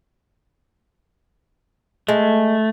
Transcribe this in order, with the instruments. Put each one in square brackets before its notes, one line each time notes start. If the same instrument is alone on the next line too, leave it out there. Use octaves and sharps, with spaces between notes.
[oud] G#3 [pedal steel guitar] A3